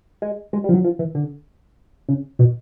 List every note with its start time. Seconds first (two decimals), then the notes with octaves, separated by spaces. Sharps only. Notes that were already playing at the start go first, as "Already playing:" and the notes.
0.22 G#3
0.53 G#3
0.64 G3
0.69 F3
0.74 F#3
0.84 F3
0.99 E3
1.15 D3
2.09 C#3
2.39 B2